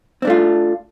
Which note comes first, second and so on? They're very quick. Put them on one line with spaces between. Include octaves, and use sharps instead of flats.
C4 D4 A3 F4